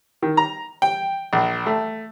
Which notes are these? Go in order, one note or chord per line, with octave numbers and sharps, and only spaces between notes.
D#3
A#5
G5
A#1
A3